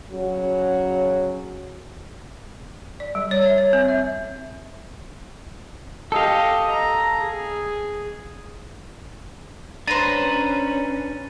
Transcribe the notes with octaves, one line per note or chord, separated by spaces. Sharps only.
C#3 F#3
D5
G3
C#5
E5
C#5
C4
E5
G4 A4 D#5 F5
A#5
G#4
C#4 D4 B4 C5 A#5 A6 D#7